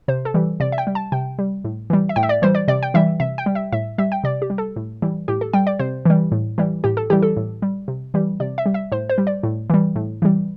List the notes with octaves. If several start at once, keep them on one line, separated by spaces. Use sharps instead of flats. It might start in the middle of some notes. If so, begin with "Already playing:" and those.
C3 C5
A4
E3 G3
C3 D5
E5
G5
G3
A5
C3 G5
G3
A2
E3 G3
E5
A2 G5
E5
D5
E3 G3 C5
D5
C3 D5
G5
E3 G3 E5
C3 E5
G5
G3
E5
A2 E5
G3 E5
G5
C3 D5
G4
G3
A4
A2
E3 G3
A2 G4
A4
G3 G5
D5
C3 C5
E3 G3
A2
E3 G3
A2 G4
A4
E3 G3 G4
A4
A2
G3
C3
E3 G3
C3 D5
E5
G3
E5
A2 C5
C5
G3
D5
A2
E3 G3
A2
E3 G3